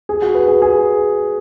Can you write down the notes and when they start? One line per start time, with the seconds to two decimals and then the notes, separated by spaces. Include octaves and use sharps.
0.09 G#4
0.22 F#4
0.35 B4
0.48 G#4
0.62 G#4